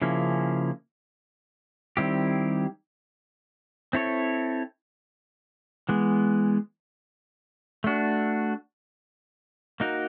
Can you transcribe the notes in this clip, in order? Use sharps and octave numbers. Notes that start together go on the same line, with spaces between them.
C#3 F3 A#3 C#4 E4
D#3 G3 C4 E4 G4
C4 E4 A4 C#5
E3 G#3 B3
A3 D4 F#4
A#3 D#4 F#4 A#4